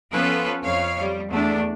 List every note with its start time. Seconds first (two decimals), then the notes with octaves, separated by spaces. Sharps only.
0.13 F3 B3 C#4 F4 A4 B4
0.64 F2 C#5 F5
1.00 G3
1.31 E2 A3 D4